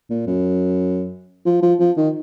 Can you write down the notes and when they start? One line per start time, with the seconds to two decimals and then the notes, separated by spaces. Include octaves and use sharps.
0.10 A#2
0.27 F#2
1.46 F3
1.62 F3
1.80 F3
1.97 D#3